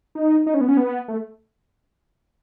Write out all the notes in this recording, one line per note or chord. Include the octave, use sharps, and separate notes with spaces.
D#4
D#4
C#4
B3
C#4
B3
A3